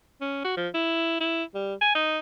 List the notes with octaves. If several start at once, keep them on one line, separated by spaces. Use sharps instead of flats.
C#4
F#4
F3
E4
E4
G3
G#5
D#4